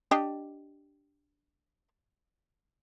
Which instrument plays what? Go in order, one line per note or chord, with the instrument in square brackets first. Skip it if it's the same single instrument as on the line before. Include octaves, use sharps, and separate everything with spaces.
[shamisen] D4 G4 D#5